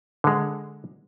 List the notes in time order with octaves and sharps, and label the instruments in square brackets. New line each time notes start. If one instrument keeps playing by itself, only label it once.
[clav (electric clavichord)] D3 G#3